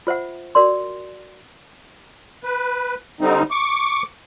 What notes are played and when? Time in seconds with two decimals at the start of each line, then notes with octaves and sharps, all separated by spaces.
0.07 F4 C5 E5 F#5
0.55 F#4 A#4 D5 C6
2.43 B4
3.21 D3 G3 C4 D#4
3.51 C#6 D6